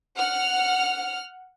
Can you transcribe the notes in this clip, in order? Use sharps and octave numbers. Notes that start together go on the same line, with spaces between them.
F#5 F6